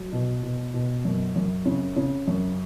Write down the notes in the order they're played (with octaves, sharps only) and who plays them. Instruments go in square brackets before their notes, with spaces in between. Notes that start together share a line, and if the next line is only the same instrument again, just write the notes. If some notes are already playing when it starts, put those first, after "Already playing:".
Already playing: [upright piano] F#3
B2
B2
B2
F#2
F#2
C#3
C#3
F#2